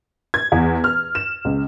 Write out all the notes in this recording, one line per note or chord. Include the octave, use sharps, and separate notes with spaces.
G#6
E2
F6
E7
C#2